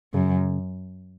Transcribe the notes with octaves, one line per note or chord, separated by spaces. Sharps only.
F#2 C#3